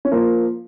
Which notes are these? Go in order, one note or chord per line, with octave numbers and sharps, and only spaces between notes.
C#4
F3 A#3